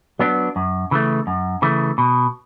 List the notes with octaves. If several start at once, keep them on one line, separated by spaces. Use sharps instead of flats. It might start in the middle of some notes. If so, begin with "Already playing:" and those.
F#3 B3 D4
F#2
C#3 E3 A3
F#2
C#3 E3 A3
B2